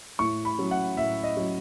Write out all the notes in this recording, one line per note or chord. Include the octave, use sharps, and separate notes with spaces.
A2 C#6
B5
F#3 C#4
F#5
A2 E5
D#5
F#3 C#4